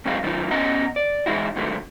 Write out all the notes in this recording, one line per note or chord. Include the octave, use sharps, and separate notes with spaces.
D2 C3 F#3 G#3 D#4 F5
D#3 F#3 D4 D#4 F4
B3 C#4 D#5 F#5 A#5
D5
E3 G#3 D#4 E4 F#4
G#2 D3 D#3 F#3 A3